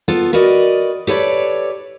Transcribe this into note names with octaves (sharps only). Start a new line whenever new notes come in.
B3 F4 A4
F#4 A#4 B4 D5 D#5
G4 A4 B4 C#5 D5